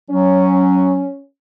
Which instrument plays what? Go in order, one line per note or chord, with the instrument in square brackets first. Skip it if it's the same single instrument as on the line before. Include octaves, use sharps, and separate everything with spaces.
[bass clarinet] F#3 [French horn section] C#4